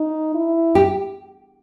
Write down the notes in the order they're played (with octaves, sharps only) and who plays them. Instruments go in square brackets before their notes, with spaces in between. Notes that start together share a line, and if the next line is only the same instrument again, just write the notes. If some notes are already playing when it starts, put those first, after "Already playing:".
Already playing: [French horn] D#4
E4
[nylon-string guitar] G4